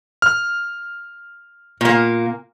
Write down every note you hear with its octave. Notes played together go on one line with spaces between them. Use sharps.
F6
A#2 A#3